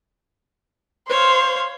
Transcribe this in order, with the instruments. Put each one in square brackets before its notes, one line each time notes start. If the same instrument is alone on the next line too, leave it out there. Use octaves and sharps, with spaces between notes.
[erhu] C5 [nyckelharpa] C#5 F5